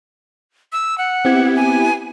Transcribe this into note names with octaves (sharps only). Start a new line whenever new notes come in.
E6
F#5
B3 C4 E4 G4 G#6
G#5